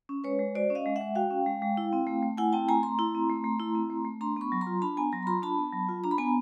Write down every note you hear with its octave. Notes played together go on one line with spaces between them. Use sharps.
C#4
G#3 B4 C#5
G#3
F#4 C5 D5
C#4
D#5 F5
G#3
E5 F#5
G#3
F#4 F5 G5
C#4
G#3
G#3
E4
C4
A3
A3
E4 F#5 G#5
C4 G5 A5
A3 G#5 A#5
A3 A#5 C6
E4
C4
A3
A3
E4
C4
A3
A3
D4 A#5 C6
B3 B5 C#6
F#3
A#5 C6
F4
D4 A5 B5
B3 G#5 A#5
F#3 A#5 C6
B5
F4 A#5 C6
D4 A5 B5
B3
F#3
F4
D4 A#5
B5
B3 G#5 A#5